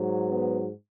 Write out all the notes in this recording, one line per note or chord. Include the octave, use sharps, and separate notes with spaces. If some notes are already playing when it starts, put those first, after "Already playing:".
Already playing: G#2 F#3
B3